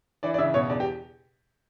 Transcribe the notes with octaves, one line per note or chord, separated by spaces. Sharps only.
E3 D5
D5
C#3 E5
B2 C#5
E2 D5
G4